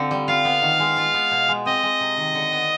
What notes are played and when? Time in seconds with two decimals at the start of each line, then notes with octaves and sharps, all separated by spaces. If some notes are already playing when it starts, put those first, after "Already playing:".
Already playing: D3 C4 F4
0.11 G3
0.28 F4 F5
0.45 B3
0.62 D#3
0.80 G#3
0.97 F4
1.14 B3
1.31 B2
1.48 G#3
1.66 C4 D#5
1.83 G#3
2.00 C3
2.17 D#3
2.34 D3
2.52 B3